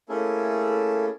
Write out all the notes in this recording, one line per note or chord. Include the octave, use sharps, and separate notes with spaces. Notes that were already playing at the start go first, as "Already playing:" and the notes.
A3 A#3 C#4 E4 G#4 A4